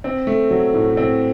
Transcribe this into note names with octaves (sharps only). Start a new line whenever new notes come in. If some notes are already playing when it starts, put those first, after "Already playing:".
C4
A3
F#3
A2
C4